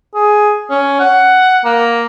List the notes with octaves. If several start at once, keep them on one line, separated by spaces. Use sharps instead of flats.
G#4
C#4
F#5
A#3